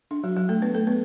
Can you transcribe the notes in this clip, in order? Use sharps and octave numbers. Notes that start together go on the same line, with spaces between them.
D4
F#3 F#4
F#3 F#4
A3 A4
B3 B4
A3 A4
B3 B4